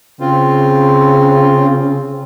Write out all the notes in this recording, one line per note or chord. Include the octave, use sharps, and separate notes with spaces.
C#3 C4 F4